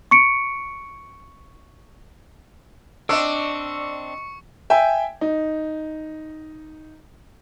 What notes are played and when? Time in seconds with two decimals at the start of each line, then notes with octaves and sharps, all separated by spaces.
0.11 C#6 C#7 D7
3.09 C4 D4 D5 D#5 C#6 E6 C#7
4.70 E5 G5 G#5
5.21 D#4